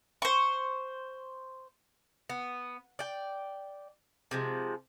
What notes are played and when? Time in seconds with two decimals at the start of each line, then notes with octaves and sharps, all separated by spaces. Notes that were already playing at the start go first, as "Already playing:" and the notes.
0.22 C5 C#6
2.29 B3
2.99 D5 G5
4.31 C3 F3 G#3